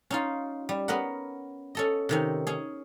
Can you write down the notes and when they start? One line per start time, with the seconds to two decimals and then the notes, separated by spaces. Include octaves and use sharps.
0.11 C#4 D#4 F4
0.69 G3
0.88 B3 C#4 A#4 B4 F#5
1.75 C#4 A4 D#5
2.09 C3 D#3 C#4
2.47 C#4 G#4